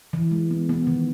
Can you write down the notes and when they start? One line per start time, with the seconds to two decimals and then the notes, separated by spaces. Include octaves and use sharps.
0.13 E3
0.31 G#3
0.51 B3
0.69 B3
0.87 D#3